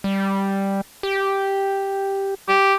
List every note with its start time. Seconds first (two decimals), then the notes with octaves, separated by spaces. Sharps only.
0.04 G3
1.03 G4
2.49 G4